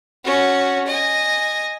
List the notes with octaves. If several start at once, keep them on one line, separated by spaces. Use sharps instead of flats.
C#4 F#4
D#5 G#5